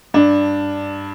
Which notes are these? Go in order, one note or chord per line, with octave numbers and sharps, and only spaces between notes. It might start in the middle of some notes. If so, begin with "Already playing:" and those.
G2 D4